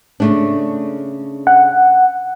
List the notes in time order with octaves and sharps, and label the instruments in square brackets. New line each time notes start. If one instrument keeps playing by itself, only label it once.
[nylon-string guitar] C#3 A3 D4
[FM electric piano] F#5